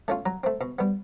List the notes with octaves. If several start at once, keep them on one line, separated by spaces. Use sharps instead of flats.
A3 C#4 F4 A5
F#3 A#5
A3 C4
B2
G3 B3